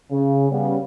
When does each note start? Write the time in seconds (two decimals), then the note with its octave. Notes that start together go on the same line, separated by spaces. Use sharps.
0.11 C#3
0.50 C#3 G3 B3